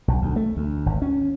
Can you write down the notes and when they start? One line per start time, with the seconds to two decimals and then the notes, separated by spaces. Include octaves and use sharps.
0.08 B1
0.22 D2
0.36 A3
0.57 D2
0.86 G#1
1.02 C#4